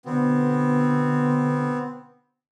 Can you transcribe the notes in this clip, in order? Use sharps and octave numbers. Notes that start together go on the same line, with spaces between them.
B2 D3 B3 C4